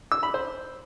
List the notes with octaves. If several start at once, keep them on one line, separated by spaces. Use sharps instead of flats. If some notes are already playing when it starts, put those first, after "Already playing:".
E6
B5
C5